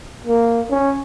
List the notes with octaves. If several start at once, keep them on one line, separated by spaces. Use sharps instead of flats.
A#3
C#4